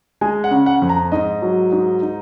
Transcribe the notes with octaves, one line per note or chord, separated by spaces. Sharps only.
G#3 G#5
F#5
C#3
F#5
F2
A#5
G#2 D#5
F#3
G#2
D#4